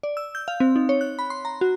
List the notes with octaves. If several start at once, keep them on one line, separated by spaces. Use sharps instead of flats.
D5
E6
G6
F5
C4
D#4
C#5
F#6
B5
C6
A#5
F#4